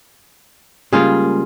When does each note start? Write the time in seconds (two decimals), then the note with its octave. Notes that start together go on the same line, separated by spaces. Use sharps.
0.93 C#2 C#3 G3 A#3 F4 G#4